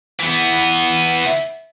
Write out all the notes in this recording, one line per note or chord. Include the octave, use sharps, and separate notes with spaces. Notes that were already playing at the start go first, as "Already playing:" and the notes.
E3 B3